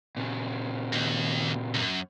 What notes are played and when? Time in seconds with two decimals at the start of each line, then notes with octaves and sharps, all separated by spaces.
0.17 A#2 C#3
0.92 D#2
1.74 C#2 F#2